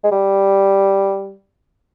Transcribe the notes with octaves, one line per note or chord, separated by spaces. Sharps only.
G#3
G3